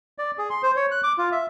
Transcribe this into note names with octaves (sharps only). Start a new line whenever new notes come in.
D5
G#4
C6
C5
C#5
F#6
D6
F4
E5